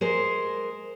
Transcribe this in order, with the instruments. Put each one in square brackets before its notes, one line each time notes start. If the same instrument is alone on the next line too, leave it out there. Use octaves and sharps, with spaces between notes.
[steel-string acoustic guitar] G#3 A#4 C5